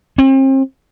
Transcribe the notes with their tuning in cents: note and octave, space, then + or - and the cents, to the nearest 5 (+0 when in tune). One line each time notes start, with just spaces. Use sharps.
C4 +40